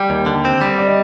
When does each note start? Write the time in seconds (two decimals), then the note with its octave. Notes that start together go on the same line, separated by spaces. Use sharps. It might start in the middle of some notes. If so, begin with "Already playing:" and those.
Already playing: G3 G5
0.10 D#2
0.26 D3
0.45 C4
0.61 G3
0.78 D5
0.88 D#5